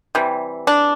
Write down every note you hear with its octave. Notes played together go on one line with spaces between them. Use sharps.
C3 E3 G3
D4